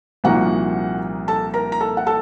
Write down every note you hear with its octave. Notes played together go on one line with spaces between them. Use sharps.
C2 A#2 F3 A#3 D#4 F#4 F#5
A4 A5
A#4 A#5
A#5
A4 A5
F#5
A4 A5